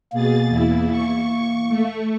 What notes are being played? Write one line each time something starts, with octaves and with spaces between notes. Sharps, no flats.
B2 A#3 G#4 A6
E2 E4
C#6
A3